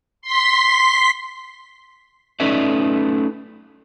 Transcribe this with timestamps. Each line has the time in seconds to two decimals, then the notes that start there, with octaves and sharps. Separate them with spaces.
0.22 C6 B6
2.40 A3 C#4 D#4 B4 D5 E5